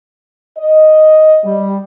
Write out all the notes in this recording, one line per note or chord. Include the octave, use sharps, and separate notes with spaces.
D#5
G3